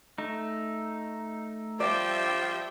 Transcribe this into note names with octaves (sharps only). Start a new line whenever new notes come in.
A3 D#4
F3 G3 D5 E5 G5